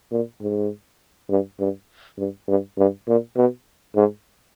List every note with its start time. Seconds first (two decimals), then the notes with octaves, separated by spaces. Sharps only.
0.12 A#2
0.41 G#2
1.29 G2
1.60 G2
2.18 G2
2.48 G2
2.77 G2
3.08 A#2
3.37 B2
3.96 G#2